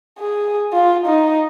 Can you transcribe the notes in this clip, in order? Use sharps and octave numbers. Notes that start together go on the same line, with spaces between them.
G#4
F4
D#4